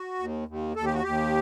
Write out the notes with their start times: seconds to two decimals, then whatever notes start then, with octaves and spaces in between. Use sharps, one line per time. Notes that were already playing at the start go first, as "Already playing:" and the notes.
Already playing: F#4
0.19 D#2
0.48 D#2
0.76 D#2 A4
0.85 G4
0.94 F#4
1.03 D#2 G4